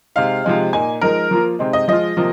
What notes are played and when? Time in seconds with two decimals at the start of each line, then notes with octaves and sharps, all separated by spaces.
0.16 C3 G#3 D#4 F5
0.44 C3 F3 G#3 D#4
0.73 A#2 A#3 D#4 G#5
1.01 F3 G#3 D#4 A#4
1.31 F3 A#3 F4
1.59 C3 G#3 C4 D#4
1.73 D#5
1.88 F3 G#3 F4 D#5
2.17 C3 F3 A#3 F4